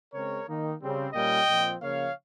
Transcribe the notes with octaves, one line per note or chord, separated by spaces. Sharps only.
C#3 G#3 C4 A#4 C#5
D#3 A#3 D#4
C#3 G3 C4
A#2 G3 A#3 C#4 D#5 G5
A#2 F3 C4
C#3 F3 A#3 C#5 F5